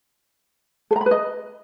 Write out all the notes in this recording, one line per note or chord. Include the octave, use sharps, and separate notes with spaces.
A4
A#5
B5
B4
D#5